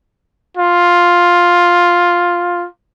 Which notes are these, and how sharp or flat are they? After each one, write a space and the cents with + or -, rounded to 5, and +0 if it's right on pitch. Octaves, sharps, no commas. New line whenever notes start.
F4 +5